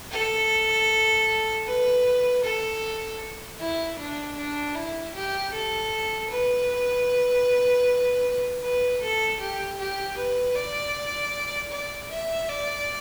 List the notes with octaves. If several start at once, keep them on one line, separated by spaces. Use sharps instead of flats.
A4
B4
A4
E4
D4
D4
E4
G4
A4
B4
B4
A4
G4
G4
B4
D5
D5
E5
D5